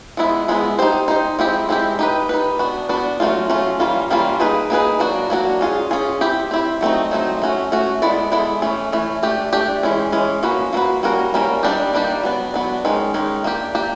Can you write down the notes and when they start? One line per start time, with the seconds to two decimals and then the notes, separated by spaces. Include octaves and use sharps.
0.17 F3 G#3 B3 E4
0.48 F3 G#3 B3 E4
0.79 D#4 G4 C5
1.08 D#4 G4 C5
1.39 F3 G#3 C4 E4 G4
1.69 F3 G#3 C4 E4 G4
1.99 D#4 G4 B4
2.29 D#4 G4 B4
2.59 B3 D4 F#4
2.89 B3 D4 F#4
3.20 F#3 A3 C#4 F4
3.50 F#3 A3 C#4 F4
3.80 E3 G3 A#3 C#4 F4
4.10 E3 G3 A#3 C#4 F4
4.40 A#3 D#4 G#4 B4
4.70 A#3 D#4 G#4 B4
5.00 F#3 A#3 D4 F#4
5.30 F#3 A#3 D4 F#4
5.61 C#4 F4 G#4
5.91 C#4 F4 G#4
6.21 C4 E4 G4
6.51 C4 E4 G4
6.81 F#3 A3 C4 D#4
7.11 F#3 A3 C4 D#4
7.42 A3 C#4 F#4
7.72 A3 C#4 F#4
8.02 G#3 B3 E4 A4 D5
8.32 G#3 B3 E4 A4 D5
8.62 E3 A3 C#4
8.92 E3 A3 C#4
9.23 A3 D4 G4
9.53 A3 D4 G4
9.83 E3 G#3 C#4
10.12 E3 G#3 C#4
10.43 F3 A#3 C#4 F#4 B4
10.73 F3 A#3 C#4 F#4 B4
11.03 G3 A#3 C#4 F#4 A#4
11.34 G3 A#3 C#4 F#4 A#4
11.63 D#3 G3 A#3 D4 G4
11.94 D#3 G3 A#3 D4 G4
12.23 F#3 B3 D4
12.54 F#3 B3 D4
12.85 D#3 G#3 C#4
13.14 D#3 G#3 C#4
13.44 A#3 D4 G4
13.75 A#3 D4 G4